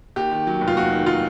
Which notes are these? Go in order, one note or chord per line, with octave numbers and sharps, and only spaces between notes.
D#2 G4
D#3
F#3
F1
F4
D#2 F#4
D#3
F#3 F4